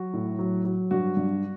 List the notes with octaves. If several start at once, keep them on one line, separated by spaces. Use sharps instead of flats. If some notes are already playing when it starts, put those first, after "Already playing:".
Already playing: F#3 F#4
A2
F#3
F#3
G2 F#4
G2